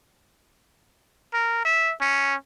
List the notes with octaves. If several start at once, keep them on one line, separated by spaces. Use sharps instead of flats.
A#4
E5
C#4